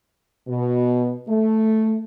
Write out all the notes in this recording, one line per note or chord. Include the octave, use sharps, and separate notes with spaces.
B2
A3